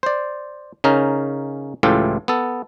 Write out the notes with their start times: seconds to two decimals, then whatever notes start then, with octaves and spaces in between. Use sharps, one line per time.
0.03 C5 D5
0.84 C#3 C#4 D#4 A#4
1.83 C#2 A2 E3 F4 G4 A4
2.28 B3 A4